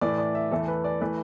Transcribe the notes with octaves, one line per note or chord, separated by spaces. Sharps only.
A2 E3 A3 D5
D5
E5
E2 E3 A3 A4
B4
D5
E3 A3 B4